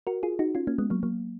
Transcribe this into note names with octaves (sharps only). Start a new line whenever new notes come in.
F#4 A#4
F4 G#4
D#4 F#4
C#4 F4
A#3 C#4
G#3 B3
F#3 A#3
F#3 A#3